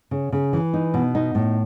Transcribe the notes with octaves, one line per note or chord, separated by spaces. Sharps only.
C#3
C#3
E3
D#4
B2
D#4
A2